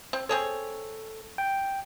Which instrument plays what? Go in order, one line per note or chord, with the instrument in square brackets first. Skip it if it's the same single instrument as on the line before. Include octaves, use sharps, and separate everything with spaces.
[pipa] C4
[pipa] C4 G#4 C#5 [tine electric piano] A4
[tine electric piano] G5